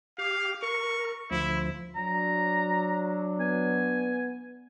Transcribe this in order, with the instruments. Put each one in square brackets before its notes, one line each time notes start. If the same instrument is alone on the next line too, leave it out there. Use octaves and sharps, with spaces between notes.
[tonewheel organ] G4 [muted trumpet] F5
[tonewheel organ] A#4 [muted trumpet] C#6
[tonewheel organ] D2 F3 [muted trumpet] E4
[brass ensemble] F#3 D4 [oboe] A#5
[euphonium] B3 [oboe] G#5